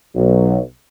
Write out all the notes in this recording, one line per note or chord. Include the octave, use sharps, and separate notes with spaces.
B1 F#3